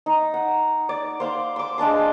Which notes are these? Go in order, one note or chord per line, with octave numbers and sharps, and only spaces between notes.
D#4
F#5
D5
C5 F5 C6 D6
C6 D6
G#3 D4 A5 C6